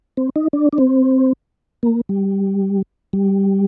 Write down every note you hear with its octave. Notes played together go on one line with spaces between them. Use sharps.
C4
D#4
D4
D4
C4
A#3
G3
G3